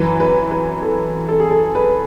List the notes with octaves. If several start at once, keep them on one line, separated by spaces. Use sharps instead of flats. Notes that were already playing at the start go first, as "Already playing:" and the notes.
Already playing: F#2 E3 B4
B4
B4
A4
A4
G#4
A4
B4